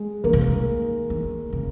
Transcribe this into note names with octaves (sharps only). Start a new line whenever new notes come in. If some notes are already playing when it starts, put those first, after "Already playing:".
Already playing: G#3
D#3 A#3
C#3
D#3
D#3
C#3